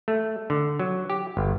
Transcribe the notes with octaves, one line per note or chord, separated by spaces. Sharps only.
A3
D3
F#3
G4
G1